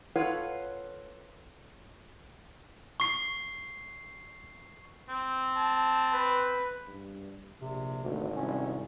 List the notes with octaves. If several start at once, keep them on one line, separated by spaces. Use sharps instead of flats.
F4 A4 B4 C#5 F5 F#5
C#6 C7
C4
A5
B4
G2
A#1 C3
G#1 D2
C2 C#4